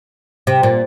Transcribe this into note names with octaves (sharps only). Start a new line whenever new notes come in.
C3
A#2